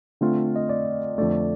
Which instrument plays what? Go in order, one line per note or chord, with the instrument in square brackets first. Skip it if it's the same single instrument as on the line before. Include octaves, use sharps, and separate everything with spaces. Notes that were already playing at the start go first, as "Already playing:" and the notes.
[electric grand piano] D3 A3 C4 F4
[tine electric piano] D#5
D5
[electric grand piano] F2 D3 A3 [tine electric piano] D5